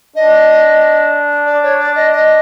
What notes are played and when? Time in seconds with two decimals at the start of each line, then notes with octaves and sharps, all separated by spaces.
0.15 D4 D#5
1.46 D5
1.63 C#5
1.79 D5
1.95 D#5
2.12 D#5